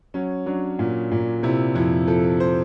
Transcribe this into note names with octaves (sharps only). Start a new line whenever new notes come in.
F#3 C#4
F#3 D4
A#2
A#2
C3 E4
F2 E4
F3 A4
C5